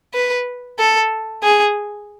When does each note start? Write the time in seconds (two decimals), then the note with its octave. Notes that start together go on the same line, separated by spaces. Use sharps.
0.14 B4
0.79 A4
1.43 G#4